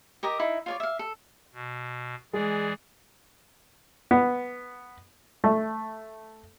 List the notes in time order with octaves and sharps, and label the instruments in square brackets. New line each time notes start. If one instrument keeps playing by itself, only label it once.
[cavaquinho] G4 A#4 D#5 A#5
D#4 E4
F4 C#5 D5
E5 F5
A4
[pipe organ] B2
[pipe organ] E3 G#4 D5 [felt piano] G#3
[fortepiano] B3
A3